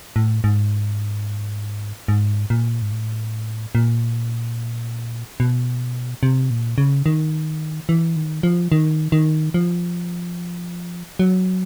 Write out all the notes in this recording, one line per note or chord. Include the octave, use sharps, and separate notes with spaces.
A2
G#2
G#2
A#2
G#2
A2
A#2
B2
C3
A#2
C#3
D#3
E3
D#3
F3
D#3
D#3
F3
F#3